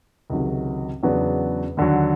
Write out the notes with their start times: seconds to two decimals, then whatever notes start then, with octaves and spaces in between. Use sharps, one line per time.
0.30 C#2 C3 D#3 F#3
1.03 E2 C#3 F#3 B3 D4
1.77 D#2 D3 F#3